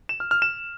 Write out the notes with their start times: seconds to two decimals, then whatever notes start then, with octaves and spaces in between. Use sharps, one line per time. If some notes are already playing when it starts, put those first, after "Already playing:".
0.09 E7
0.20 F6
0.31 F6
0.42 E7